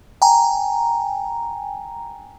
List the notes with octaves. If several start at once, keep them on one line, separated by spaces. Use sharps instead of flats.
G5 G#5 A#5